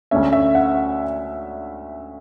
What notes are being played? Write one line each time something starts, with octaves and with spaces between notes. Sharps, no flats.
D2 D3 A3 C#4 E5
E5
F#5